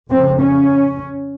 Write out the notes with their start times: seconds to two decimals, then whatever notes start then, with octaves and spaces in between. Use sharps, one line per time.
0.10 F2 C#3 C4
0.40 C#4